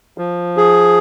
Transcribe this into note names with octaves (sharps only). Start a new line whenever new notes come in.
F3
G#4